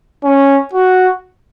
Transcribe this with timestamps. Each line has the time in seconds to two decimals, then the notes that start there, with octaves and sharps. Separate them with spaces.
0.24 C#4
0.73 F#4